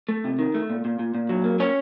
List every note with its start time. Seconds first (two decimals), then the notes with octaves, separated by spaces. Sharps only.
0.09 A3
0.24 C3
0.39 D#3
0.54 A3
0.70 A#2
0.85 A#2
0.99 A#2
1.15 A#2
1.29 F#3
1.44 A#3
1.59 A#3 C#4 C#5